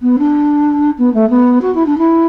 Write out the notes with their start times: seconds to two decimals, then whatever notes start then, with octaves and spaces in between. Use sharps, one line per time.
0.02 B3
0.18 D4
0.98 B3
1.14 A3
1.29 B3
1.61 F#4
1.74 E4
1.86 D4
1.98 E4